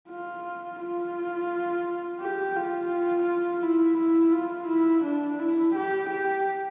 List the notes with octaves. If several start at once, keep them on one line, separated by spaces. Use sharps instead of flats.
F4
F4
G4
F4
E4
E4
F4
E4
D4
E4
G4
G4